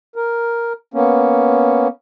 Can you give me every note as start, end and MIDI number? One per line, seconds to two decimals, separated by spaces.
0.16 0.73 70
0.94 1.88 58
0.94 1.88 59
0.94 1.88 61